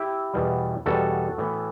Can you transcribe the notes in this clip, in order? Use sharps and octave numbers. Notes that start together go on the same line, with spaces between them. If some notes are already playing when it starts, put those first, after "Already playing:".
Already playing: E4 G4
E2 B2 G3
E2 B2 G3 F#4 A4
A2 E3 B3